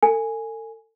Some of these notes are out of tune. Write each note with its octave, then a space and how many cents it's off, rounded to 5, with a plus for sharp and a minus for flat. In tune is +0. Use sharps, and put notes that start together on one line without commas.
A4 +35 G#5 +0